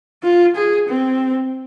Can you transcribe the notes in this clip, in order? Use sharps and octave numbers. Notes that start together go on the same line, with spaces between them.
F4
G#4
C4